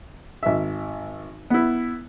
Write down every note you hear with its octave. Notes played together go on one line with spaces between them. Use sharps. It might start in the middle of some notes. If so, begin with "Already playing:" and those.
G#1 E5
B3 E4